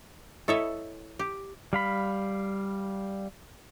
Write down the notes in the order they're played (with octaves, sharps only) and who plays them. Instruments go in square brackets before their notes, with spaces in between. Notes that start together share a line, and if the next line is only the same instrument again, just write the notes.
[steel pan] E4 D#5 C#6 [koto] A4 C#5 E5
[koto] G4
[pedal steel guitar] G3 F5 B5